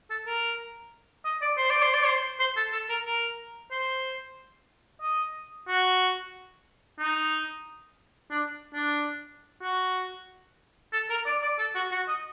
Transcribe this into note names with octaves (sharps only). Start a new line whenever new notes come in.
A4
A#4
D#5
D5
C5
D5
C5
D5
C5
C5
A4
A4
A#4
A#4
C5
D#5
F#4
D#4
D4
D4
F#4
A4
A#4
D5
D5
A4
F#4
F#4
D#5